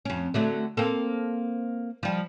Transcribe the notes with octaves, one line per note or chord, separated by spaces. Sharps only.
F2 C#4
D3 F#3 A3
A#3 C4 A4
F3 G3